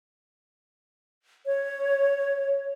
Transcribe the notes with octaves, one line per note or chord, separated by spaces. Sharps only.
C#5